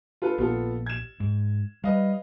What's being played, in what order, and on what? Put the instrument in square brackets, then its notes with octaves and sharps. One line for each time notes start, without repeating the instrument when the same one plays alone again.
[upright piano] F4 A4 B4
[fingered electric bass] A#1 [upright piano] B3 F4 A4
[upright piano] G#6 E7
[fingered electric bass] G#2
[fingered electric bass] G3 [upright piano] B4 D#5 F5